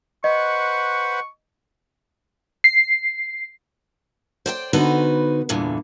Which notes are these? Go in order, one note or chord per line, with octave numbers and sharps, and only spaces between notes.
B4 C5 D#5 F#5 C#6
C7
C5 D5 G5
D3 B3 D#4 F#4 B4 C5
E2 G2 A#2 D3 E3